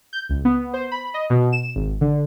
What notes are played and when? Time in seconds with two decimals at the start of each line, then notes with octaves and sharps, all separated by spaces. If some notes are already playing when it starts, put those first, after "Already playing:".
0.13 G6
0.29 C#2
0.45 B3
0.74 C5
0.92 B5
1.14 D#5
1.30 B2
1.52 E7
1.76 G#1
2.01 D3